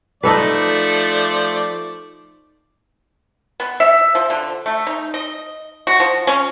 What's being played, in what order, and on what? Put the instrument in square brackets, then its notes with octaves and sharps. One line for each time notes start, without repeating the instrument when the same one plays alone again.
[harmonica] F3 A3 D5 [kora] D#4 A4 B4
[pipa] B3
E5
F3
D3
A3
D#4
D#5
F#4
F3
C#4